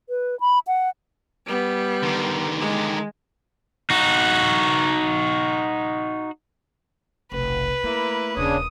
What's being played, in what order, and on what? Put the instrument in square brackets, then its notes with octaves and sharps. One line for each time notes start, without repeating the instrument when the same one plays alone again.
[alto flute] B4
B5
F#5
[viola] G3 B3
[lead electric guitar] D3 D#3
[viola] G#3
[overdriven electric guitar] D#4 F#4
[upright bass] F1 B1 [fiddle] B4
[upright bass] A3 [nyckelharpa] A#3 E4
[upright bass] D#1 F2 [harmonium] C#3 D4 C#5 [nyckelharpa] D#6